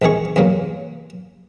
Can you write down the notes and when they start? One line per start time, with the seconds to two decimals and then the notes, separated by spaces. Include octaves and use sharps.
0.02 A#1 E2 D#3 G#4 C#6
0.36 E2 G2 F#3 A#3